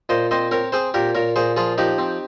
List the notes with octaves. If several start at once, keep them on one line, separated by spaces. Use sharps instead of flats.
A#2 C5 D#5
C4 C5 D#5
C4 A#4 C#5
C4 G#4 C5
A#2 G4 A#4
A#2 A#4 C#5
A#2 G#4 C5
F3 F4 G#4
F3 D#4 G4
C4